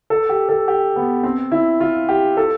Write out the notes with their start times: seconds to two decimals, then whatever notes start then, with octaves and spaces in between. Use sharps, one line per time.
0.10 A4
0.29 G4
0.49 A4
0.68 G4
0.96 B3
1.23 C4
1.52 E4
1.80 F4
2.09 G4
2.37 A4